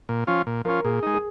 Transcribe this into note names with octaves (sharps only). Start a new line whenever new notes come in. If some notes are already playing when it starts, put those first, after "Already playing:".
A#2
F3 C#4 F4
A#2
F3 C#4 F4 A#4
A#2 G#4
G#3 D#4
G#4